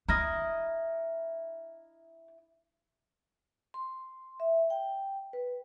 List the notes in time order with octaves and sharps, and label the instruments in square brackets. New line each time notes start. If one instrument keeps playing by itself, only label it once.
[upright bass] D4 [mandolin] E4 D#5 [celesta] A#5 F6 A#6
[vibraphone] C6
E5
G5
B4